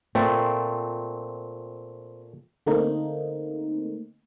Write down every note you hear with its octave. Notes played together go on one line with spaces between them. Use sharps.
A#2 A3 C4
D3 A3 A#3 C4 D#4